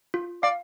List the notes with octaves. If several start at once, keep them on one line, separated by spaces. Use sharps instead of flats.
F4
D5 F5